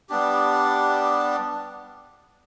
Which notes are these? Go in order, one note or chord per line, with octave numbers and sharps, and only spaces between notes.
G3 B3 D4 G4